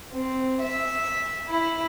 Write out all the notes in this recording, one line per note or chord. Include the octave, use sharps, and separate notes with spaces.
C4
E5
E4